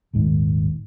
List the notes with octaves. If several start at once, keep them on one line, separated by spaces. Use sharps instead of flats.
D#1 G#1 G#2 D#3